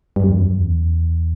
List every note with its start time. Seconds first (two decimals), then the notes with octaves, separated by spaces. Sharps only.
0.16 G2
0.23 F#2
0.31 E2
0.37 F#2
0.58 E2